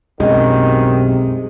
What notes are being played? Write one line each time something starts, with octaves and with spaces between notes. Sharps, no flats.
B1 F#2 C3 D#3 G#3